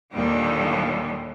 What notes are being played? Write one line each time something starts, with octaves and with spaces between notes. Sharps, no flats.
D#2 A#2 D3 G3